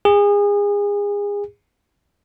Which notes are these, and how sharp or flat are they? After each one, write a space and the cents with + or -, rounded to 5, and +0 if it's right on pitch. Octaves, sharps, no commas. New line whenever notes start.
G#4 -30